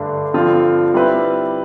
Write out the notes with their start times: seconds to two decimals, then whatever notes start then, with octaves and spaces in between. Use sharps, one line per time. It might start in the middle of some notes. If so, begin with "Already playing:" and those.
Already playing: G2 D3 A3 D4
0.34 G2 D3 F3 C4 F4
0.94 G3 C4 E4 B4